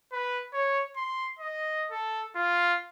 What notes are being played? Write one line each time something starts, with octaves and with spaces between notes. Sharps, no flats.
B4
C#5
C6
D#5
A4
F4